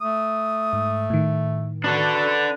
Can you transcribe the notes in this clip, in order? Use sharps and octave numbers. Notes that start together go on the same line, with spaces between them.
A3 D#6
G#2
A2 D#3
D4 F#4 A4 B4